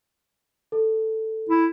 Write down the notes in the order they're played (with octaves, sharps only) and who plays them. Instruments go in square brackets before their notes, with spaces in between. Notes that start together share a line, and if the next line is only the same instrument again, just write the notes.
[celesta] A4
[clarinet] E4